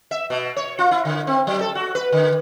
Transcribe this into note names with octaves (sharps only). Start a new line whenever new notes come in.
E5
B2
C#5
F4
E4
D3
C4
F#3
A4
F#4
B4
D3